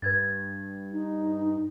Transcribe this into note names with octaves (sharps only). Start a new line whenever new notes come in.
G2 B4 G#6 A6
D#4